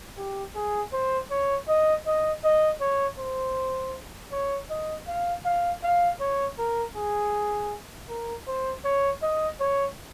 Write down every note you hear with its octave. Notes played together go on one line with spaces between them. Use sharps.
G4
G#4
C5
C#5
D#5
D#5
D#5
C#5
C5
C#5
D#5
F5
F5
F5
C#5
A#4
G#4
A#4
C5
C#5
D#5
C#5